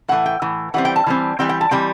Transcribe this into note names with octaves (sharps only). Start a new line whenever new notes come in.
A2 E3 A3 F#5
G5
A2 E3
E3 G3 C4 F#5
G5
A5
E3 G3 C4
E3 G3 C4 G5
G5
A5
E3 G3 C4 G5